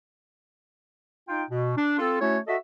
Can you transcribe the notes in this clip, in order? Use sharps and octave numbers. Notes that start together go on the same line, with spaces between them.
D#4 F4 G5
B2
D4
C4 F4 A4
A3 C#4 E4 F#4 C#5
F#4 A4 D#5 E5